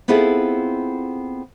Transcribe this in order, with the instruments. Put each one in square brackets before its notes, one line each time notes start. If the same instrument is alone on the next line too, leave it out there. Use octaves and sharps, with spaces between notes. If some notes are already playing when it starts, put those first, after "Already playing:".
[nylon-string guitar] B3 C4 E4 F4 G#4 A4